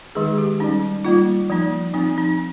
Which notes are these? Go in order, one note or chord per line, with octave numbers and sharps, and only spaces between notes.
D#3 G#3 D#4 G#4
G4
G3 C#4 D#4
G3 A#3 D#4 F4
F3 A#3 D#4
F3 C4 D#4
D#4